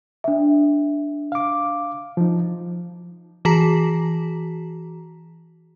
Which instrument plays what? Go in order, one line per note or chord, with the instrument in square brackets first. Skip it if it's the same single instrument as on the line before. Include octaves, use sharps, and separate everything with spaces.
[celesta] D4 E5
[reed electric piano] F5 D6
F3 D#4
[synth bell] E3 F#4 G#4 A5 A#5 B6